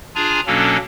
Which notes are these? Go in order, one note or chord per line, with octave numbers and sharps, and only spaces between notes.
D4 F4 G#4 G#5 A#5
B2 F#3 A#3 C#4 D4 A4